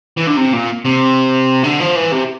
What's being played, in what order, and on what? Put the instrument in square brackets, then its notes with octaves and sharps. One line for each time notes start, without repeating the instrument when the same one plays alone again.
[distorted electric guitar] E3
D3
C3
A#2
C3
D3
F3
E3
C3